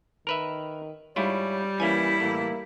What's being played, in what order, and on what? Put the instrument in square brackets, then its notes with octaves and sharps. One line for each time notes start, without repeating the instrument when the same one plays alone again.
[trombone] D#3 [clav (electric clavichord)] A#4 B4 E5
[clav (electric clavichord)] G#2 E4 F4 [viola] G3 [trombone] C#5
[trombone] E3 [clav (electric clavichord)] A#3 C#4 G#5 [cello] E4
[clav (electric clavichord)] A2 E3 [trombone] A#3